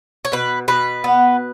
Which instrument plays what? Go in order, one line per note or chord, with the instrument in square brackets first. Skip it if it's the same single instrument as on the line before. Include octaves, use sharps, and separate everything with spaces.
[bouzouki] C#5
B2 B4
B2 B4
B3